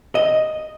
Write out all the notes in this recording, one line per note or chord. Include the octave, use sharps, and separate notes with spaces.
D#5